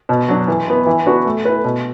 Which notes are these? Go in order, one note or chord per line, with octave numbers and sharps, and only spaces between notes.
B2
F#3 D4
E3
B3 E4
E3
B3 D4 F#4 B4
A3
E4 B4
B2